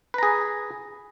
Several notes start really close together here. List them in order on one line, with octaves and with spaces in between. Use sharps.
B4 A#5 G#4